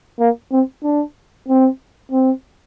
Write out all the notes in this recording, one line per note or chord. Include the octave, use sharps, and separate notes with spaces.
A#3
C4
D4
C4
C4